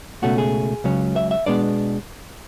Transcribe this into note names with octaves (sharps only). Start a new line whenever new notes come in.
C#2 B2 A3 C#4 F#4
G#4
C#2 C#3 F#3 C#4
E5
E5
B2 G#3 B3 D4 D5